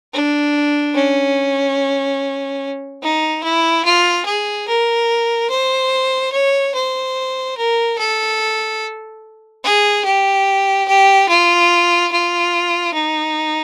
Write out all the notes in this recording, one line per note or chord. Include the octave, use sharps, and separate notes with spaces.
D4
C#4
D#4
E4
F4
G#4
A#4
C5
C#5
C5
A#4
A4
G#4
G4
G4
F4
F4
D#4